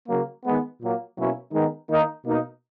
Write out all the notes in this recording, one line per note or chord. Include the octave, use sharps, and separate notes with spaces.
C#3 F#3 A#3
D#3 G#3 B3
A#2 F#3 A#3
B2 F#3 A#3 C#4 E4
D#3 G#3 B3 D#4
D#3 A#3 D#4
B2 A#3 D#4